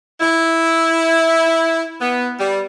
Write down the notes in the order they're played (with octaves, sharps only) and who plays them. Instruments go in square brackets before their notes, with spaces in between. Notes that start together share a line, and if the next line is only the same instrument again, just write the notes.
[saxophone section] E4
B3
G3